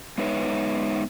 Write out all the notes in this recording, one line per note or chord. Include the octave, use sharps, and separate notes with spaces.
G#3 B3 D#4 B4 C#5 E5